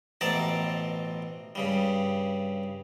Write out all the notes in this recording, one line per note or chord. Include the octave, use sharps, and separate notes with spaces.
A1 B2 C4 D5 A5 A#5
G2 C#3 G3